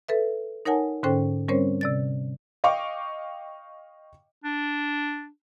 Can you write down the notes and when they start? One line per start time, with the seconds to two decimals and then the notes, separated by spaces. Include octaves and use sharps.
0.08 A4 B4 E5
0.65 D#4 A#4 C#5 F#5 G#5 A5
1.03 G#2 D3 C#4 A4 C5 G5
1.48 G3 C4 C#4 A#4 C5 C#5
1.81 C3 D5 A6
2.64 D#5 F5 G5 C#6 D6
4.44 D4